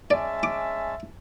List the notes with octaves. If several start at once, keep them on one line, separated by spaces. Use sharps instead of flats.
G#3 C#4 D5 E5 A5
D6